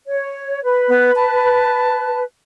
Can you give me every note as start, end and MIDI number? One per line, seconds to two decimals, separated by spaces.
0.07 0.62 73
0.64 2.24 71
0.88 1.11 59
1.16 2.22 81